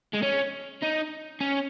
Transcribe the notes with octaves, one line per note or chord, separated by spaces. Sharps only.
G#3
C#4
D#4
C#4